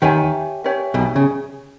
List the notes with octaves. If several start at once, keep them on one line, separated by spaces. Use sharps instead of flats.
D#2 D#3 G4 C#5 E5 G#5
G4 C#5 E5 G#5
B1 B2
C#3